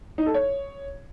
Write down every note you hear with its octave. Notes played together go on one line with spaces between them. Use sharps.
D#4
A4
C#5